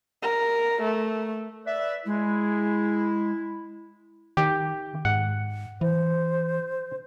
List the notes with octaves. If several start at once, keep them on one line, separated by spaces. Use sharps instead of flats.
A#4
A3
B4 D5 E5
G#3 E4
D#3 G4
G#2 F#5
E3 C5